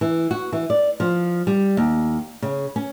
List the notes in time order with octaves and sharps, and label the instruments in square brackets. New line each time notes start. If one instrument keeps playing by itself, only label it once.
[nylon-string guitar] E3
F#4
E3
D5
F3
G3
D#2
C#3
C#4